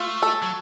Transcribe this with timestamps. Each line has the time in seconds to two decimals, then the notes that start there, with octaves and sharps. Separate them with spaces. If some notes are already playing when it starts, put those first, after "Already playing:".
Already playing: A3 F4
0.22 A4
0.42 F#3